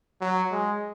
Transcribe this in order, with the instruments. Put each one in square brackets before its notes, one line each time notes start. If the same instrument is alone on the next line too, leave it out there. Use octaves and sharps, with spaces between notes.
[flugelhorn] F#3
G#3